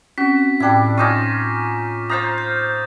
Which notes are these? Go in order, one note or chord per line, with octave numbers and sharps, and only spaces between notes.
C4 C#4 F#4 B6
A2 G3 D4 E4 G5
C#4 D#4 F4 C#6 D6 A#6
C5 F5 A#5 D#6 G6 A6
G6